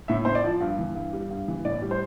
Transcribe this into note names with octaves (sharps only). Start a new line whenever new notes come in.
A2 E5
A2 C5
D5
F3
G2
E3
G2
G3
G2
E3
A2 D5
G3
C5